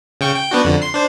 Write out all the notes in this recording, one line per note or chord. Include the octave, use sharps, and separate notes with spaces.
C#3 G5 C#6
G5
B3 D4 F#4
F2 D3
C6 C7
D4 C5